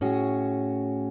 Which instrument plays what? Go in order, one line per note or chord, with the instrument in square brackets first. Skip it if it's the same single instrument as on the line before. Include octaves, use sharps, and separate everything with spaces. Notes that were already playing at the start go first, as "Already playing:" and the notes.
[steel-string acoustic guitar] A2 C#4 F#4 G#4